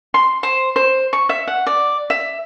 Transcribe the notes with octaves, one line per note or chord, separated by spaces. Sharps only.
C6
C5
C5
C#6
E5
F#5
D5
E5